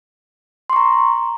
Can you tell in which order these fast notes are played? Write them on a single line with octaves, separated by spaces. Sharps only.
C6 C#6 A#5